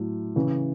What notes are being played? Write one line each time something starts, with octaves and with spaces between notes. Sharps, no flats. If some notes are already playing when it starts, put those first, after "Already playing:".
Already playing: A2 F#3
C#3 E3